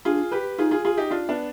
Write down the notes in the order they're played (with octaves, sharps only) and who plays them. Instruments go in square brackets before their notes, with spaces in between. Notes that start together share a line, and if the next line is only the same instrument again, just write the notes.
[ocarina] D4 [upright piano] F4 G#4
[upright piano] G4 B4
[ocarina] D#4 [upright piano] F4 G#4
[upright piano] F4 G#4
F4 G#4
D#4 G4
D4 F4
B3 D4